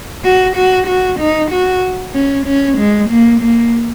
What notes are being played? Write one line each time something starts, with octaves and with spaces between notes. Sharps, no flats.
F#4
F#4
F#4
D#4
F#4
C#4
C#4
G#3
A#3
A#3